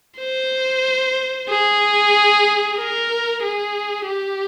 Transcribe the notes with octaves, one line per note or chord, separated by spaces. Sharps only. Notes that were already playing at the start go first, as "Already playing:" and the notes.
C5
G#4
A#4
G#4
G4